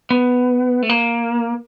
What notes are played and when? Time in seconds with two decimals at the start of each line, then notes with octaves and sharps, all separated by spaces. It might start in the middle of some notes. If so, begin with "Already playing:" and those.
0.10 B3
0.82 A3
0.89 A#3